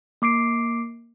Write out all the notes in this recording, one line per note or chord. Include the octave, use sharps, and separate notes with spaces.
A#3 D6 C7 D7